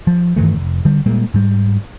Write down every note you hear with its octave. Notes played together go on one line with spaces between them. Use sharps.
F3
G2 D#3 E3 A3
F1
D3 G3
A#2 G3 G#3 A#3
G#2 G3